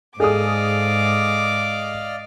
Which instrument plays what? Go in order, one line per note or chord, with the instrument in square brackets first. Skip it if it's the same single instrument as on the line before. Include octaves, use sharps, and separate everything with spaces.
[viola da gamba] G#2 [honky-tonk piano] G#4 A4 D#6 [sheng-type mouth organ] D5 D#5 F5 [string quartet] D6